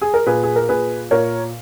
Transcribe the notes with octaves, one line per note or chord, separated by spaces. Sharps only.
G#4
A#4
A#2 G#4 B4
G#4
A#4
A#2 G#4 B4
A#2 A#4 C#5